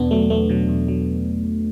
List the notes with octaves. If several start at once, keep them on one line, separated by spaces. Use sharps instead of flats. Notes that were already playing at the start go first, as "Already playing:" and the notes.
Already playing: E2 B2 B3 D4
F#3 A3
E2 A3
B2 F#3
E2
F#3